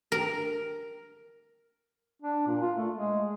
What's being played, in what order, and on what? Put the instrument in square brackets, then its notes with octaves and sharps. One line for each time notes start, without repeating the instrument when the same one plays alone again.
[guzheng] A#4
[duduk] D4
A#2
F4
A3
G#3